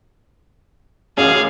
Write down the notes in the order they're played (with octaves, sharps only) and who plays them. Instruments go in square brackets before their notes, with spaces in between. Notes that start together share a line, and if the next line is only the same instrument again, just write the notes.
[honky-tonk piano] A1 F#2 [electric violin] G#4 F5